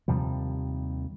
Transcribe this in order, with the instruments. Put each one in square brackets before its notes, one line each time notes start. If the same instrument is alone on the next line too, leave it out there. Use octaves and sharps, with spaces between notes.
[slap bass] D#2 C3 F3 G3